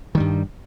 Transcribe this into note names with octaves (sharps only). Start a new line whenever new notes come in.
G2 D#3 G3